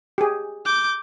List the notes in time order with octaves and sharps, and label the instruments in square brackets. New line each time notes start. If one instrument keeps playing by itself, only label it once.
[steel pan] G4 G#4
[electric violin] D6 G6